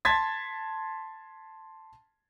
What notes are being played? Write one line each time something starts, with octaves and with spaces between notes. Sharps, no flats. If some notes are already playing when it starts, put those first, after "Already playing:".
A5 C6 G#6 A6 B6